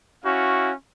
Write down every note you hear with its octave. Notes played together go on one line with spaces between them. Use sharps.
C#4 E4 F#4 F5